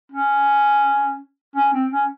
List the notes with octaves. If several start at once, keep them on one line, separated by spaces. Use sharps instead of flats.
C#4
C#4
C4
C#4